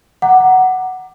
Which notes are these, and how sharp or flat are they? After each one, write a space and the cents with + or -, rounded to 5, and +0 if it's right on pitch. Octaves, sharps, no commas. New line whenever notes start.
F#5 +10 A#5 +0 D6 +15